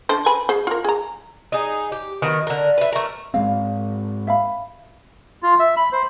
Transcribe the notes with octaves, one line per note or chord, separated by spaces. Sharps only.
D4 A4 C5
B4 G#5 B5
G#4 C5
F4 A#4
G#4 A#5
D#4 G#4
G4
D#3 F#3 B3
D3 A#4
B4 E5
A3 A#4
G#2 G#3 C4 F5
E5 F5 B5
F4
E5
B5
C5